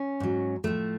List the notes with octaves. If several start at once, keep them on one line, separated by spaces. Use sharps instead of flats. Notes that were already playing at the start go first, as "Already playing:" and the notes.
Already playing: C#4
G#2 F#3
A2 F3 A3